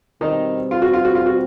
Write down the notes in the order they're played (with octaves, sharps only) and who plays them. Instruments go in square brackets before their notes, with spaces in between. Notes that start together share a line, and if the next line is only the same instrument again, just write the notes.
[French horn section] B2 G3 C4 [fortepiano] D#3 D#4
[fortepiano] F4
F#4
F4
F#4
F4
F#4